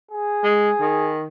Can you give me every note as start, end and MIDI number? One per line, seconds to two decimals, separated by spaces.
0.11 1.13 68
0.43 0.70 56
0.80 1.27 51